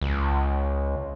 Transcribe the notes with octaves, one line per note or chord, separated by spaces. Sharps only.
C#2